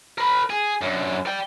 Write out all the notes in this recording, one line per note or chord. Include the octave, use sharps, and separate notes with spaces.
A#4 B5
G#4
F#2 D3
D5 G5